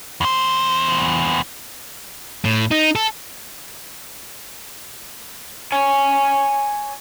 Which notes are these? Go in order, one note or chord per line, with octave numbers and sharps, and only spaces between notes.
E2 C5
A2
D#4
A4
C#5 G#5